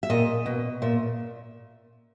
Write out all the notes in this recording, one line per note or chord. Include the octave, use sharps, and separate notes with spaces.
E5
A#2 D#5
B2
A#2 E5